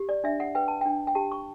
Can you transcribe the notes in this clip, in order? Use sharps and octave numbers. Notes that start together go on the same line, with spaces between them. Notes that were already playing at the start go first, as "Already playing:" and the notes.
Already playing: G4
D5
D4 E5
F#5
B4 G5
A5
D4 G5
G5
G4 A5
C#6